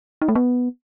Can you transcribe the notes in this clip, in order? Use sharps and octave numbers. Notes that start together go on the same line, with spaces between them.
D#4
A3
B3